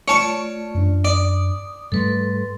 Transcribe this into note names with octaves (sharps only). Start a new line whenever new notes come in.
A3 F4 C#5 D5 A5 C#6
F#2 D4
D5 D#6
G#2 G3 A3 A4 B4 C6